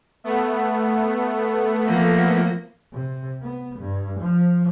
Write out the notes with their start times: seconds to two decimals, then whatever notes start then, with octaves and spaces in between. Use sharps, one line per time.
0.24 A3 B3
1.86 F3 A#3
2.93 C3
3.42 B3
3.80 G2
4.20 F3